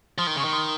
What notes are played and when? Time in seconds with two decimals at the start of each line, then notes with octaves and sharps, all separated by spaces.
0.18 F3 C6 D#6
0.27 D#3
0.36 C#3
0.40 D#3 C#6
0.53 C6 D#6